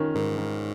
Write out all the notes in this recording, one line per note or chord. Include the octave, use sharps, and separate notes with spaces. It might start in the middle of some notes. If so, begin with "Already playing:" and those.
Already playing: D#3 C#4 F4
G#2 D#3
D#3